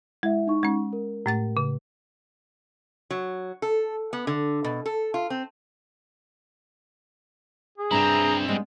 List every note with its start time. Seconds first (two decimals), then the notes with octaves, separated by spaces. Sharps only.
0.23 G#3 E4 E5
0.47 D#4 C#6
0.63 G#3 C#4
0.93 A#4
1.26 A2 A3 A6
1.57 C#3
3.11 F#3
3.62 A4
4.13 B3
4.27 D3
4.64 B2
4.86 A4
5.14 F4
5.30 C4
7.78 G#4
7.91 G2 C4 D4 E4 E5 A#5
8.48 G3 G#3 B3